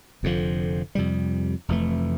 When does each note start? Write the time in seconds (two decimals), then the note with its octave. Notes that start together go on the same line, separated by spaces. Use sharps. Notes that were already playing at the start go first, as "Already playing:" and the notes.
0.23 F1 F2 D3 F3
0.95 F2 C3 G3
1.68 F1 F2 E3 A3